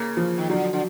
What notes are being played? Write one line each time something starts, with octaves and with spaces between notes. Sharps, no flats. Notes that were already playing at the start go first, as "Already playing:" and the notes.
Already playing: C#3 A#3
F3
D#3
D3 F#3
D3